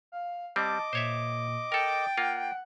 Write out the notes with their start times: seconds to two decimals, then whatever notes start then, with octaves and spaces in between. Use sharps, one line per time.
0.12 F5
0.56 G3 C4 D#5 A5 D6
0.93 A#2 C5 C#5 E5
1.72 A4 A#4 G5 A6
2.18 A#3 F4 F#5